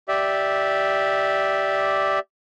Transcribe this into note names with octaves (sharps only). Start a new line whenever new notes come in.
G4 D5 E5